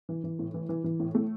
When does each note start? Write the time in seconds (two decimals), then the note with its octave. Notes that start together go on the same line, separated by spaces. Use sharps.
0.09 E3
0.24 E3
0.39 A2
0.54 E3
0.69 E3
0.84 E3
1.00 A2
1.15 A3